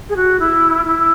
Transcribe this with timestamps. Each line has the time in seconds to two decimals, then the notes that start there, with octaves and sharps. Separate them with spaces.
0.09 G#4
0.16 F#4
0.39 E4
0.85 E4